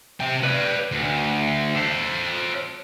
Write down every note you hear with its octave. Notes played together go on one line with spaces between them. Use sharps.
C3 G5
B4 D5
D2
A4 C5